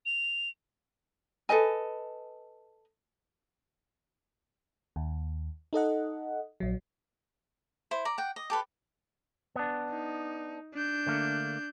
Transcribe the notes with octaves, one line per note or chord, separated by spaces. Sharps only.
F7
A4 B4 D#5 G#5
D#2
D#4 A4 D#5 F#5
A#1 F#3
E4 C5
D5 A#5
F#5 G5
D#5
G4 A4 B4
B3 D4
D#4
D4 G6
D3 A3 A#3